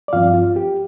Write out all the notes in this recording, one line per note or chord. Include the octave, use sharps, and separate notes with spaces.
D5
G2 F3 C4 F4 F5
F4
G4